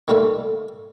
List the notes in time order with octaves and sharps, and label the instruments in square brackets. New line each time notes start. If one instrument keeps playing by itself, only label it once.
[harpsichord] D#3 G3 A3 F4 A4